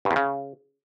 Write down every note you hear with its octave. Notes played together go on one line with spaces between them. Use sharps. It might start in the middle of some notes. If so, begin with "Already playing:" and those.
G2
E2
C#3